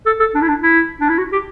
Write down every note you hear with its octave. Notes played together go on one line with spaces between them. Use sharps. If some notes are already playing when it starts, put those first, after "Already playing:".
A4
A4
D4
E4
D4
E4
D4
E4
F#4
G4